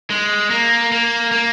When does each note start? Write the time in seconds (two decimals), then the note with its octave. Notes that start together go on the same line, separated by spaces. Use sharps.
0.10 G#3
0.51 A#3
0.92 A#3
1.32 A#3